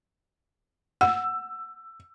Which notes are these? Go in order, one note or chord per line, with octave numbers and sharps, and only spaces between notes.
F#5 E6